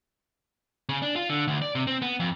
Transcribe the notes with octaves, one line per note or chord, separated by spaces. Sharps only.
C#3
D4
F4
D3
D2
D5
C3
C4
B3
F2